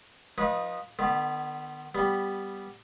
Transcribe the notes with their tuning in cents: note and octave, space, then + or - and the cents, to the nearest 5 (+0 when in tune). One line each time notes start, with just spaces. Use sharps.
F3 +25 D#4 +0 B4 -25
D3 +45 B3 +0
G3 +0 B3 +0